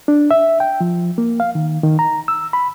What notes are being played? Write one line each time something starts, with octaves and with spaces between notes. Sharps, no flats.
D4
E5
G5
F3
A#3
F5
D#3
D#3
A#5
E6
B5